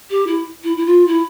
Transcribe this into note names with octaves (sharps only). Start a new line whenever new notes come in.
G4
E4
E4
E4
F4
E4